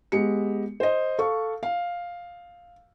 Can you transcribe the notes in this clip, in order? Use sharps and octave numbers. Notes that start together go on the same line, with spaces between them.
G#3 B3 G4 C#7
C5 D#5
A4 F5 C#6
F5